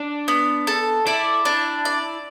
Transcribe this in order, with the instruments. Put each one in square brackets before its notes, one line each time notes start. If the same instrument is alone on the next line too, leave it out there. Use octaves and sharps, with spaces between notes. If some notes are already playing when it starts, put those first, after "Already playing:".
Already playing: [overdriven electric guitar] D4
[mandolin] B3
A4
[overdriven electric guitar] E4 [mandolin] D5
[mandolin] D4
D5